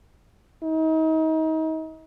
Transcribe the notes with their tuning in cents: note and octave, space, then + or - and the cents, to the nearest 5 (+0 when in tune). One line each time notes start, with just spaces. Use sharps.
D#4 +35